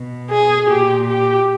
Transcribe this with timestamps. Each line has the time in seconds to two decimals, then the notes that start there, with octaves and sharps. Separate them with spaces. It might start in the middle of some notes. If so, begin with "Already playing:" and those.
Already playing: B2
0.30 G#4
0.69 A#2 G4
1.07 G4